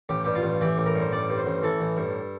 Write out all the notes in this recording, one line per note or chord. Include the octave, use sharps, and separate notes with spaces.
A1 G4
G2 G4
F4
A1
E3 G4
A1
A#4
G2
C5
A1 D5
G2
C5
A1
E3 A4
A1
G2